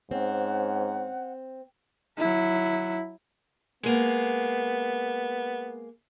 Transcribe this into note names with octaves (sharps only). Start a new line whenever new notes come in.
G#2 C4 C#4 F#5
F#3 E4
G#3 A#3 B3